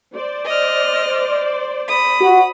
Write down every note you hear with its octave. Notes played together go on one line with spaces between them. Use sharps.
C5 D5
D#5 F6
B5 D#6
F#4